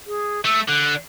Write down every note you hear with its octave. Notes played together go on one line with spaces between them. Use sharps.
G#4
A3 E6
D3 F#6